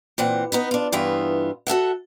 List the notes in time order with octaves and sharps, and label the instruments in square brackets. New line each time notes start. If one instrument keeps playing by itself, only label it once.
[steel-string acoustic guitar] A#2 E3 C4 F#5
B3 D#4 B4
D4 F4
G2 E3 B3 F4 E5
F#4 A4 E5 F#5